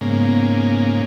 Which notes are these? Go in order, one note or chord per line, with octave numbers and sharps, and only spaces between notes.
G#2 C#3 A#3 B3